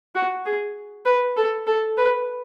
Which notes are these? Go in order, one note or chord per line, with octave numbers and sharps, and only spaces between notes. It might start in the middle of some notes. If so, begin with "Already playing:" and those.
F#4
G#4
B4
A4
A4
B4